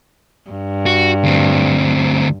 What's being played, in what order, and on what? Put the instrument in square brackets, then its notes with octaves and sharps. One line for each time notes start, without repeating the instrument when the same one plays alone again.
[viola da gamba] G2
[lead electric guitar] F#4
D2 C4